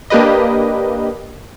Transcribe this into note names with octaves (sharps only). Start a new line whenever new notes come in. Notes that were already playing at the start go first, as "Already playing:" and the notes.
A#3 D4 G4 B4 D#5